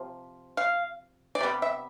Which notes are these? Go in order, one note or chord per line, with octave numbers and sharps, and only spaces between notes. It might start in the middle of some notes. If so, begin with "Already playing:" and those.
Already playing: C3 F3
F5
D5
C3 G3 B3
E5